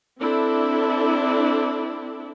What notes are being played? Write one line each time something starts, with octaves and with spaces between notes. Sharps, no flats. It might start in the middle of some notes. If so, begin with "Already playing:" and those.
C4 D4 E4 A4